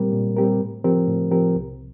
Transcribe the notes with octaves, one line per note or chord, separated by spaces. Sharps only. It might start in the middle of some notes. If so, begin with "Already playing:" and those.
Already playing: A#2 G3 C4 G4 A#4
A#2
G3 C4 G4 A#4
A2
F3 C4 G4 A#4
A2
F3 C4 G4 A#4
C2